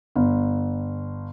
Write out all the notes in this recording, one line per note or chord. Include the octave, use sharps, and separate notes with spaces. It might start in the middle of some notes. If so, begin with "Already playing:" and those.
G1